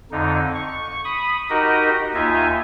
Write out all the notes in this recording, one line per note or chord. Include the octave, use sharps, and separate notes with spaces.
F2 D3 D#4
C#6
B5 D#6
D#4 F#4 G4 A#4 D#5
D#2 D#4 F4 E5 G#5